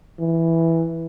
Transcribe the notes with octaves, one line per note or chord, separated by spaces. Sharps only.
E3